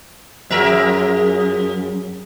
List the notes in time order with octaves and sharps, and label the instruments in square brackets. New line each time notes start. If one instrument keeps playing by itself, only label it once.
[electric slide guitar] F#2 [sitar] F3 A#4 E5 [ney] G#4